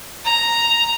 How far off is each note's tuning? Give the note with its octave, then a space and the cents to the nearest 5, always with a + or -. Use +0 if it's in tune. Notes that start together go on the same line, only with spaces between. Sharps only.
A#5 +0